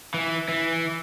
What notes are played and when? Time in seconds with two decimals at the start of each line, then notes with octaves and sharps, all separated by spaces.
0.14 E3
0.48 E3